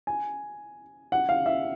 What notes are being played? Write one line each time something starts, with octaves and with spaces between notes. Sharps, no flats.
G#5
F#5
F5
E5